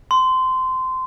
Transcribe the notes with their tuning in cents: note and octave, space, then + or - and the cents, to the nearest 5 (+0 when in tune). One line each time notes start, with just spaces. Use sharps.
C6 -20